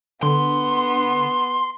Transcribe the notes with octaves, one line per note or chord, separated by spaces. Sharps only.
D3 B3 C6